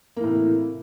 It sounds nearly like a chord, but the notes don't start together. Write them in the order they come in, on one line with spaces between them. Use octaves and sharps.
A#3 E3 A2 C3